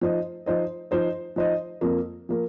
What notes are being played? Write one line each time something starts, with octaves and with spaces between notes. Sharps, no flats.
F3 D#4 C5 D#5
F3 D#4 C5 D#5
F3 D#4 C5 D#5
F3 D#4 C5 D#5
F2 F3 A#3
F3 A#3